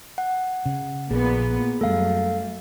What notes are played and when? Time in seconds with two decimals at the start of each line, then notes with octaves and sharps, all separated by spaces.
0.18 F#5
0.66 C#3
1.11 A#1 A#2 B3 G#4
1.81 F#2 G3 A3 A4 F5